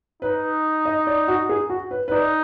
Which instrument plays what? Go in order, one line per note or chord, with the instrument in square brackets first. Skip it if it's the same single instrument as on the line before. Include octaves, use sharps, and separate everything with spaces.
[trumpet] D#4 [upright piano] B4
[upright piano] D#5
D5
F#4
G#4
F#4
B4
B4
[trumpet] D#4 [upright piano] D5